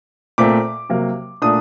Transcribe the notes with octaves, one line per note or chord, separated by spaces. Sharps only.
A#2 A3 C4 D6
C3 F#3 A#3
A#2 A3 D4 D#6